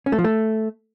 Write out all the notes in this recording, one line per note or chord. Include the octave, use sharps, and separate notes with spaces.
C#4
A3
F3
A3